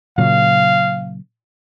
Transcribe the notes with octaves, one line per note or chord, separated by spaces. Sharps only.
A#2 C#3 F#3 F5